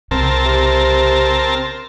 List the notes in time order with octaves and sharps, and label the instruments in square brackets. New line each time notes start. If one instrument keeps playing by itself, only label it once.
[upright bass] C2 C#3 [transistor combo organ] C4 A#4 A5
[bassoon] C3